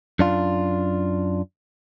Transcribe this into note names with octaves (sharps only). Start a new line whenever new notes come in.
F#2 D4 F4